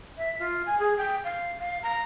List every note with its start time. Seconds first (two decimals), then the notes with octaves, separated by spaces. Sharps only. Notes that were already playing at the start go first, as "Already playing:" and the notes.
0.17 E5
0.39 F4
0.66 G#5
0.79 G#4
0.97 G5
1.24 F5
1.59 F5
1.82 A#5